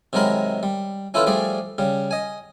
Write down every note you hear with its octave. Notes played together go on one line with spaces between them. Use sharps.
C3 D#3 F#3 G#3 A#4 B5
G3
C#4 E4 F4 A4 B4
F3 G3 A3 G#4 D5
C#3 G3
D#5 G#5